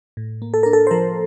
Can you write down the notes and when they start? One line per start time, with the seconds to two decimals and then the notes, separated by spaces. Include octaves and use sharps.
0.17 A2
0.42 A#3
0.54 A4
0.63 D4 A#4
0.73 A4
0.87 C5
0.91 F3 A#4